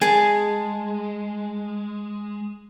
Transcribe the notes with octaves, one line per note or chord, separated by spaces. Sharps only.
G#3 G#4 G#5 A5